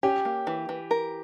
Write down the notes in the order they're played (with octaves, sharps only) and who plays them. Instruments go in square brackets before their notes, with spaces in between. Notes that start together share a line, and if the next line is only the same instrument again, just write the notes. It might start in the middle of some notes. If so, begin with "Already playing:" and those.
[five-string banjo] C#4 [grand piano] G4
[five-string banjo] A#3
E3
E3
A#4